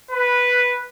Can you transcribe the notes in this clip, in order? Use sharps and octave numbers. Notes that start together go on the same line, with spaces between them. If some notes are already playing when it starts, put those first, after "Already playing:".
B4